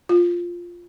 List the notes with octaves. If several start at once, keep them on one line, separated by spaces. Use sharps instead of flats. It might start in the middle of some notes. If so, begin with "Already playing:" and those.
F4